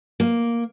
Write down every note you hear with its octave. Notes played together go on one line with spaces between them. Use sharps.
A#3